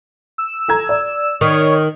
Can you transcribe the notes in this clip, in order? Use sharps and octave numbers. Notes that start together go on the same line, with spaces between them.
E6
A4 A#5 G#6
D5
D#3 C#5